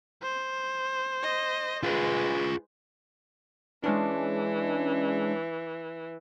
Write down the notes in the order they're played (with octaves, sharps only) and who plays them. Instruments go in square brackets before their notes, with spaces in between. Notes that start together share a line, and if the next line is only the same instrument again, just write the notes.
[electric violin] C5
[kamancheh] D#5
[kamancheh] G#3 B4 [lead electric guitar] F4 G#4
[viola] E3 [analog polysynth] G#3 C#4 D4